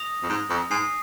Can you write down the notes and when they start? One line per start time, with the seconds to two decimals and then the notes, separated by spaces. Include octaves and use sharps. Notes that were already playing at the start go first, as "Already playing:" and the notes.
Already playing: D#6 A#6 F7
0.23 F2
0.30 G#2
0.50 F2
0.70 G#2 G#5 D#6 C7